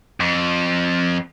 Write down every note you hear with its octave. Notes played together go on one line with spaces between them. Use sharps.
F2